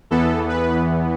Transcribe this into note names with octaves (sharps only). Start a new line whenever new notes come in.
E2 E3 B3 A4
B4